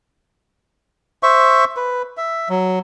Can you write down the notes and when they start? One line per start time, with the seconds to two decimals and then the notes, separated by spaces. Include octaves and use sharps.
1.23 C5 E5 C#6
1.77 B4
2.17 E5
2.49 F#3